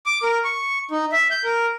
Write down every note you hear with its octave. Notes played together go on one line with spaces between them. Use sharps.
D6
A#4
C#6
D#4
E5
G6
A#4